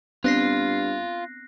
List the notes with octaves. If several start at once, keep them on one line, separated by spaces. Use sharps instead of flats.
G2 B3 C4 D4 F4 F#6 A#6 C7